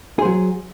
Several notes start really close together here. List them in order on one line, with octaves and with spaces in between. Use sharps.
G#4 C5 F#3